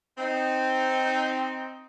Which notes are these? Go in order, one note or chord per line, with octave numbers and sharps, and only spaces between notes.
C4 D#4